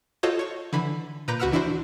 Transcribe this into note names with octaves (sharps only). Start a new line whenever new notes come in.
F4 F#4 A4 C5 C#5 D#5
C#5 C#6
D3 E3 B5
A#2 B4 A#5 D6 G6 A#6
C#2 F#4 B4 F#5 E6 F6
E3 D4 E4 F#4 C5